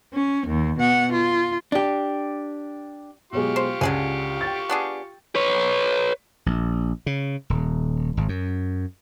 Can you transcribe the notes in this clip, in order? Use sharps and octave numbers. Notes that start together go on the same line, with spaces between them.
C#4
D#2
B2 F#5
F4
D4 G4
B2 F#3 G#3 F4 G4 C#6
C5
C#2 D3 G#4 G#5
G5 A6
B3 D4 G#4
B4 C#5
A#1
C#3
D#1
G#1
F#2